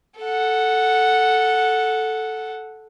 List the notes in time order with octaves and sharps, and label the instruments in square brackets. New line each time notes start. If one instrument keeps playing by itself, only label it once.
[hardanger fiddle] A4 F#5